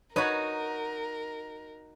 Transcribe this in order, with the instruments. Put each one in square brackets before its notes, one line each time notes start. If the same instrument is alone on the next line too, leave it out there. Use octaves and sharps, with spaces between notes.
[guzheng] D#4 F#4 [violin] A#4 [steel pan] B4 C#5